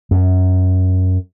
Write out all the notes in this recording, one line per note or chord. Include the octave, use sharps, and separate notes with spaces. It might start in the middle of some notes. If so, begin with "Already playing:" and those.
F#2